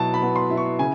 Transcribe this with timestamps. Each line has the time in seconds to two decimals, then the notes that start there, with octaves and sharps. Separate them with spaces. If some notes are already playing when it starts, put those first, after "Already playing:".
Already playing: B2 F#3 B3 E4 A5
0.14 B5
0.22 B3
0.36 C6
0.50 E4
0.57 C#6
0.79 C#3 G#5